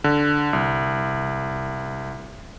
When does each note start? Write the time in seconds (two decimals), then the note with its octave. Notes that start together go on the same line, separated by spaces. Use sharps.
0.04 D3
0.53 C2